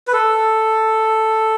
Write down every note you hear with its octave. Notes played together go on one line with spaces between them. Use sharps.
B4
A4